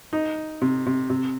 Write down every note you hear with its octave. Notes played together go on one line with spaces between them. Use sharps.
D#4
C3
C3
C3